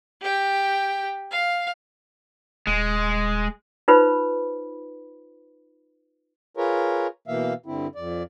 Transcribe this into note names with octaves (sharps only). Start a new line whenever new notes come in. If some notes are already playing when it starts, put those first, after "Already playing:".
G4 G5
F5
D#1 G#3
D#4 F4 B4 C5 B5
F4 G#4 A#4 B4 C#5
B2 E3 A#3 E5 F5
G2 D3 C4 E4
F2 D5